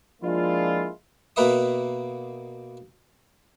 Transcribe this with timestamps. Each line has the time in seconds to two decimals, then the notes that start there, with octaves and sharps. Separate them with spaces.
0.22 F3 G#3 A#3 D4 E4 F4
1.36 B2 A#3 B4 E5 D#6